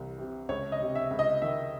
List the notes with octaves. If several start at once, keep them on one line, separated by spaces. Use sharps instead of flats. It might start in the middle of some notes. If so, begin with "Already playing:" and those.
Already playing: C2 E3
C3
C#2 C#5
D#5
C3
E5
C#2
D#5
D#3 E5